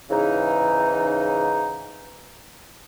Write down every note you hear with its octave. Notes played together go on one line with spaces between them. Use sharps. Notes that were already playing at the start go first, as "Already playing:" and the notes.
G#2 C#3 E3 D#4